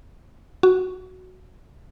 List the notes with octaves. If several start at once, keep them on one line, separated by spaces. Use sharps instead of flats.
F#4